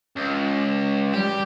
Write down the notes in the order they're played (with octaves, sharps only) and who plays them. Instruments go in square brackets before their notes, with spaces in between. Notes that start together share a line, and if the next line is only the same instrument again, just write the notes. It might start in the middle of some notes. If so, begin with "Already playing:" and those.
[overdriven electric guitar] C#2
[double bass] G3 [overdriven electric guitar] G4